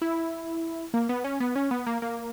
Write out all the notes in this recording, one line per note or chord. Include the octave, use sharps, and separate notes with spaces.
E4
A#3
B3
C#4
B3
C#4
B3
A#3
A#3